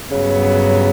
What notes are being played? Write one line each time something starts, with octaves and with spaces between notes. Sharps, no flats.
G2 C#3 F#3 B3